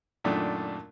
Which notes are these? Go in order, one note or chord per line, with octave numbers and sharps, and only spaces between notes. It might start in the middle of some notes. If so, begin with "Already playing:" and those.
F#2 A#2 D#3 A3 D4